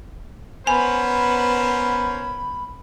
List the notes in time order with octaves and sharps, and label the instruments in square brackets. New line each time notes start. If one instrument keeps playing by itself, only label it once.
[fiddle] B3 [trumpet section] C#4 A#4 C5 [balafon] G#5 [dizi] B5